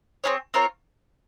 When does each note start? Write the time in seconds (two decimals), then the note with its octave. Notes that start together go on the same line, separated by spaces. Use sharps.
0.24 C4 E4 G#4 C#5
0.54 C4 F4 A#4 C#5